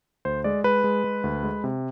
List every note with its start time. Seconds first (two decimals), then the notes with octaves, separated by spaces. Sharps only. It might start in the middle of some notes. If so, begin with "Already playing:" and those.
0.25 D2 C5
0.44 G#3 D5
0.64 G#3 B4
0.84 G#3
1.04 G#3
1.24 D2
1.43 G#3
1.64 C3